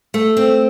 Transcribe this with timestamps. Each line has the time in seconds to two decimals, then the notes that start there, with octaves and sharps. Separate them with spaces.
0.14 A3
0.37 C4